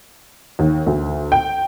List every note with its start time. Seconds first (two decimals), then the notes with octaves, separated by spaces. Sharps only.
0.59 D#2
0.86 D2
1.32 G5